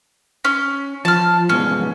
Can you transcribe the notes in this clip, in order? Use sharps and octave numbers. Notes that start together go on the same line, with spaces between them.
C#4
F3 A5 F6
G2 B2 G#3 C#4